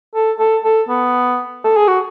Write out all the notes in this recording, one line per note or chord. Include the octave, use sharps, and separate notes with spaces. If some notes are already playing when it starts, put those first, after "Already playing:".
A4
A4
A4
B3
A4
G#4
F#4